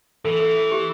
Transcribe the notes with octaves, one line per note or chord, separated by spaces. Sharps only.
E3 A4
A4
A4
G4